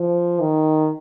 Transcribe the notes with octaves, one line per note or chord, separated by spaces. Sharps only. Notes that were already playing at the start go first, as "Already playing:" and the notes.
Already playing: F3
D#3